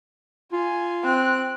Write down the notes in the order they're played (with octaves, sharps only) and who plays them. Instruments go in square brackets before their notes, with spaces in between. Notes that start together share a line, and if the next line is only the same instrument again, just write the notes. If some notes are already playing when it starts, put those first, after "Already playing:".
[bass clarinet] F4 [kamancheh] G#5
[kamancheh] C4 F#6